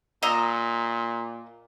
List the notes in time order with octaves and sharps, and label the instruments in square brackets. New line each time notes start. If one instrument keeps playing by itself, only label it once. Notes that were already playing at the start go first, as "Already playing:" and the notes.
[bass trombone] A#2 [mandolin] D#5 A#5 E6